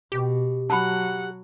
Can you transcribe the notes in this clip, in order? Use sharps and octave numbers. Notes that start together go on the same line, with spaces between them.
B2 G4
F#3 F#5 A5 B5